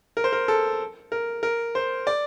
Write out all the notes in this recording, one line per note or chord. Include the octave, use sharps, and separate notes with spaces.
A#4
C5
A#4
A4
A#4
A#4
C5
D5